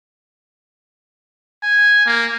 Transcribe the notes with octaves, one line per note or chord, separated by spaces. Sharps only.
G#5
A#3